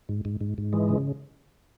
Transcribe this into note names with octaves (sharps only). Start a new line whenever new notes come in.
G#2
G#2
G#2
G#2
E3 G#3
C#3